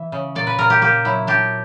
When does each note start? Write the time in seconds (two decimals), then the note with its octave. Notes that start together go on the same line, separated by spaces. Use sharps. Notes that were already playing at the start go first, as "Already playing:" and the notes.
Already playing: E3 E5
0.12 C#3
0.35 A#2 D5
0.47 B4
0.58 A#2 A#4
0.70 G4
0.81 A#3 G4
1.05 F#3 E4
1.27 D4 G4